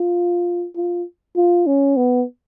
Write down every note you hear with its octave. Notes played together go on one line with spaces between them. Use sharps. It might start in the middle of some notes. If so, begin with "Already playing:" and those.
Already playing: F4
F4
F4
C#4
B3